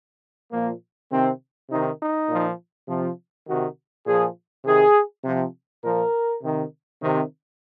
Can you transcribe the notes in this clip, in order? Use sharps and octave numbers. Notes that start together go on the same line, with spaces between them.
A#2 F3 A#3
C3 D#3 C4
C3 D#3 D#4
D#4
A#2 F3
C3 F3
C3 D#3 F#4
A#2 F3 G#4
C3 D#3 G#4
C3 F3
A#2 F3 A#4
C3 D#3
C3 D#3